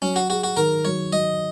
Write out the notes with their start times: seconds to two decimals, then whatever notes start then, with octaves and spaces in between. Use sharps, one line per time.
0.02 F#3 C#4
0.16 F#4
0.30 F#4 G#4
0.44 F#4
0.57 D#3 A#4
0.85 F#3 C#5
1.13 F#3 D#5